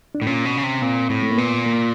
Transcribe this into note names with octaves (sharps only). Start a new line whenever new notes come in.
D4
A2
A#2 C#4
B2
C#3
C3
A#2 C4
A2
A3
A#3
A#2 B3
A#3